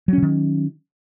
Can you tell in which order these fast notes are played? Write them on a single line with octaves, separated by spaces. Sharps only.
F#3 C#4 D3 D#3